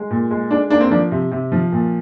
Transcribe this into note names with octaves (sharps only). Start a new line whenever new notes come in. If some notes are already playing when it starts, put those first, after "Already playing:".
Already playing: G#3
A#2
G#3
G#3 D4
A#3 D4
C4
F3 D4
C3
C3
F3
A#2